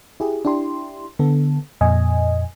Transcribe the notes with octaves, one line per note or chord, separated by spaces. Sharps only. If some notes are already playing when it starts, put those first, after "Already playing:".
E4 G4 G#4
D4 E4 G4 C6
D3 B3 A4
F2 A#2 D#5 G#5